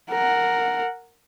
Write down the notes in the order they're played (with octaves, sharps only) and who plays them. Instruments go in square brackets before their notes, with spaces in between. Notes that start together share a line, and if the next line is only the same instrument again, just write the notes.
[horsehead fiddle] A#4 F#5